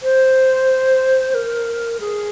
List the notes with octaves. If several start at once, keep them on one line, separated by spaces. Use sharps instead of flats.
C5
A#4
G#4